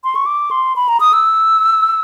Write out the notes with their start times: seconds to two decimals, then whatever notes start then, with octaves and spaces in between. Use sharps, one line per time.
0.04 C6
0.15 C#6
0.26 D6
0.51 C6
0.76 B5
0.89 A#5
1.00 D#6
1.13 E6